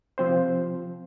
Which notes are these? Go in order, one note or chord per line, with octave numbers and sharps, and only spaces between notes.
C3 F3 C4 C5